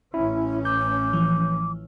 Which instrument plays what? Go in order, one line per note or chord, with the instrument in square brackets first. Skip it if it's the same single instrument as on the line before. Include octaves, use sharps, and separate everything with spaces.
[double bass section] A1 C#4 [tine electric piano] E4
[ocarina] D6 [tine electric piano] G6
[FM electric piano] E3 F3